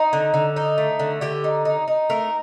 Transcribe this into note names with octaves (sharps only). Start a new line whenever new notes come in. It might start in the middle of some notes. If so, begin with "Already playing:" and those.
Already playing: D#4
D3
D3
D#4
A3
D3
D3 G4
D#4
D#4
D#4
A3 A#4